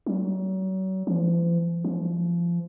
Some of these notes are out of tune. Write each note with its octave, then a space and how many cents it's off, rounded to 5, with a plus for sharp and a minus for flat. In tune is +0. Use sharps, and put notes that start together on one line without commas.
F#3 +35
F3 -45
F3 -25